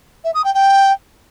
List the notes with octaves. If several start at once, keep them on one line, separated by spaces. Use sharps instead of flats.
E5
D#6
G5
G5